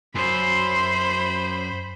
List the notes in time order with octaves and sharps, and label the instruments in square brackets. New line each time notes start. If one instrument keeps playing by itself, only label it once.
[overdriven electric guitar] F#2 [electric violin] C5 B5 [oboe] C6